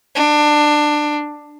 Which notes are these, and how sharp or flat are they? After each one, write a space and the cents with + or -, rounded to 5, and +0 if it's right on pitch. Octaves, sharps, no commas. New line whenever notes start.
D4 +20